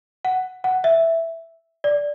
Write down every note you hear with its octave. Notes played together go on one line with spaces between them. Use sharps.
F#5
F#5
E5
D5